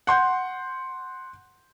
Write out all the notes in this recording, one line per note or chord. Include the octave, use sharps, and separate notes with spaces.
F#5 C6 G6